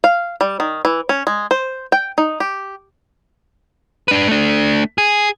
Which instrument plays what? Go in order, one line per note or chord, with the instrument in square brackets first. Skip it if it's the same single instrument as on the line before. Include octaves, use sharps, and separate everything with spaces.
[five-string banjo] F5
G3
D#3
E3
C#4
G#3
C5
G5
D#4
G4
[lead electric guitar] D4 B4
A3 D4
G#4